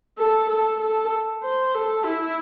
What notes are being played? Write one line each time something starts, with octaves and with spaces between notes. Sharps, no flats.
A4
A4
A4
C5
A4
E4